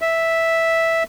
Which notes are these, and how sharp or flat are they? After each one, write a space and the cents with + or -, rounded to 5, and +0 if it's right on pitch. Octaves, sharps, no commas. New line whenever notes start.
E5 -5